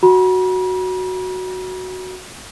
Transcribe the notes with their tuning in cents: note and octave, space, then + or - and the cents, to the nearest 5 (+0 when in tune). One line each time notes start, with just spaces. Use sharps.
F#4 +0 B5 -45